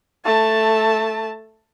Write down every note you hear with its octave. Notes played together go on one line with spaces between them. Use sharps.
A3 A5